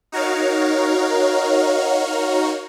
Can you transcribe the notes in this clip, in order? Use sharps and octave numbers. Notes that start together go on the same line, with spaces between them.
D#4 F#4 A#4 C#5 F5